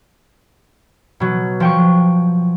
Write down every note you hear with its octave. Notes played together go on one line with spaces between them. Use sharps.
B2 F#3
F3 G5 C#6